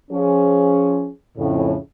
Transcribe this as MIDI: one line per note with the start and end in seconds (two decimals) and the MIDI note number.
0.11 1.08 53
0.11 1.08 61
0.11 1.08 68
1.37 1.74 41
1.37 1.74 45
1.37 1.74 49